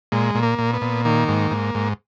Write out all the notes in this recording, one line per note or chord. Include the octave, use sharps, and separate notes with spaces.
A#2 G#3
A#2
A#3
A#2
B3
A#2
D#3 A#3
G#2
G#2
G#2